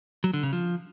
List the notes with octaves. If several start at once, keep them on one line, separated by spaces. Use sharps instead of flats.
F#3
D3
C#3
F3